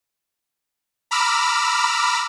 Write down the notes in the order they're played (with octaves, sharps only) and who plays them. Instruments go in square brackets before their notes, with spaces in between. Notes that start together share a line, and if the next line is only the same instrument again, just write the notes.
[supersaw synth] A#5 B5 D6 E6 F6